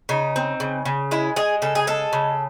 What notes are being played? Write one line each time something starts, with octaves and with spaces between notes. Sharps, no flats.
C#3 D#4
C4
C#3
C#3
G#3 E4
G#3 G#4
C#3 A4
G#4
G#3 A4
C#3